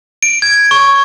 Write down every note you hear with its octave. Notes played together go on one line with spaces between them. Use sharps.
D7
G#6
C#6